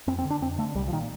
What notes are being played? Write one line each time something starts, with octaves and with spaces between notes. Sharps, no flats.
F2 C4
C4
D3
D4
F2 C4
D3 A3
C2 G3
F3
A#2 D#3